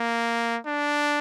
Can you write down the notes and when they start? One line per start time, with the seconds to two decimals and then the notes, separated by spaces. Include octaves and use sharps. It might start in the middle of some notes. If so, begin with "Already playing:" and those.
Already playing: A#3
0.66 D4